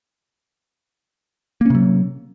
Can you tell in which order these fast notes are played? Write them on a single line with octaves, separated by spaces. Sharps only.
A#3 C#4 C3 F#3